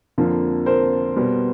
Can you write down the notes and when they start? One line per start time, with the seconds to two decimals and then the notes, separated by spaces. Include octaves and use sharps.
0.18 F2 D3 F3 A#3
0.66 A#4 C5
1.16 B2 G3 B3